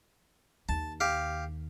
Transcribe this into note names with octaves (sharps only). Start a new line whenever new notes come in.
D#2 A5
G4 F5